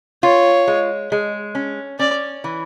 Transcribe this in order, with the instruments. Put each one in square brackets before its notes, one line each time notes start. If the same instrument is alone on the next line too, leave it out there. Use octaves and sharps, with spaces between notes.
[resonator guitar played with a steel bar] F4 [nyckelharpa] C#5
[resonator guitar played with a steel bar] G#3
G#3
C#4
[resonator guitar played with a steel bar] C#4 [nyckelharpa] D5
[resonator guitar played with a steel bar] E3